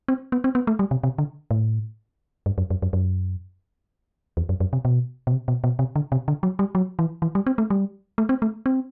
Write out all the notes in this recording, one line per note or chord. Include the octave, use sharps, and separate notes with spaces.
C4
B3
C4
B3
A3
G3
C3
C3
D3
A2
G2
F#2
F#2
F#2
F#2
E2
F#2
F#2
C3
B2
B2
C3
B2
B2
C3
D3
C3
D3
F#3
G3
F#3
E3
E3
G3
C4
A3
G3
A3
C4
A3
C4